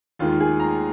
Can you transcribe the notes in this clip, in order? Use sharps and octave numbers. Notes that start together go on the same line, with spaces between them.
D#2 D#3 G#3 F4
G#4
A#5